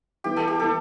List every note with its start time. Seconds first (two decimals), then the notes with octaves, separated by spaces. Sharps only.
0.24 E3 B3 E4 G4
0.36 A4
0.48 G4
0.59 E3 B3 E4 A4